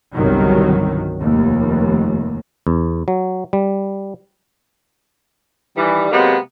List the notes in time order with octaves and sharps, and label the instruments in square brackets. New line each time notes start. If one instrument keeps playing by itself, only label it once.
[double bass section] G1 C2 G2 C3 D#3 F#3
F1 D#2
[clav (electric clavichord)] E2
F#3
G3
[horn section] D#3 E3 G3
C3 F#3 G#3 A#3 B3